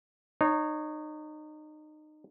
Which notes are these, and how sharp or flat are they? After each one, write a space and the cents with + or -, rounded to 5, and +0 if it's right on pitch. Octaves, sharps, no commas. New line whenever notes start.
D#4 -30 C#5 +0